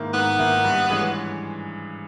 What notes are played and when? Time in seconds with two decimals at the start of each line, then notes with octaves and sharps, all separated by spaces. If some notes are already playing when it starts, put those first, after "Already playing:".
Already playing: G#2 D#3 A#3 E4
0.13 G#2 B3
0.39 D#3 A#3 E4
0.65 G2
0.90 E3 G#3 C#4